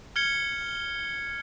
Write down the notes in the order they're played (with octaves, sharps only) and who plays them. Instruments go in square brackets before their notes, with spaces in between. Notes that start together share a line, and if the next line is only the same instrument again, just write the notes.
[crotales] F6 G#6 C#7 G7